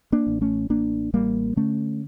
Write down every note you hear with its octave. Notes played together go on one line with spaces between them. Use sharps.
A#3 D4
A1
A3 C#4
A1 A#3 D4
A1 G3 A#3
D3 A3 C#4